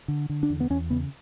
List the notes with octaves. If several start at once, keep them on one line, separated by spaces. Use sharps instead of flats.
D3
D3
D4
E2
B3
E2 C#4
C#3 B3